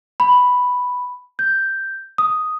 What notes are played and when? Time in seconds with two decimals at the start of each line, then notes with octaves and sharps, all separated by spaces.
0.20 B5
1.39 G6
2.18 D#6